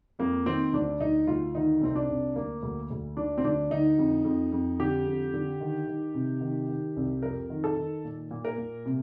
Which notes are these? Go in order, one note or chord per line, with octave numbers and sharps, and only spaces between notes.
F2 A#3
D#3 C4
D2 D4
D2 D#4
D2 F4
D#3 D#4
C2 C4
D4
C2
D2 A#3
D2
D2
D3 D4
C4
D2 D4
D3 D#4
F2
F2
F2
D3 G4
F2
D3
D#3
D#3
C3
D#3
D#3
C2
F2 A#4
D#3
A4
D#3
A#2
A#2
A#4
A#2
C3